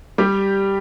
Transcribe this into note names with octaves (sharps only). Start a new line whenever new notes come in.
G3 G4